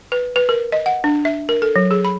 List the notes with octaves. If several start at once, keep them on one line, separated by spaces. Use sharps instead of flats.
B4
B4
A#4
D#5
F#5
D4
E5
A#4
A4
F#3
G#4
B5